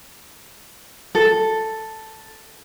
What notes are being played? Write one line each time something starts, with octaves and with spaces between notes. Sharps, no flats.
A4